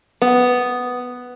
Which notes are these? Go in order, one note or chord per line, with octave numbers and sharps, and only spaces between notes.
B3